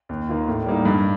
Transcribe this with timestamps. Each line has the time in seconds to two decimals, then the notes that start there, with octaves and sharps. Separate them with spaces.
0.09 D#2
0.29 D#3 A#3 F4
0.48 A2
0.66 G3 A#3 D#4
0.85 G2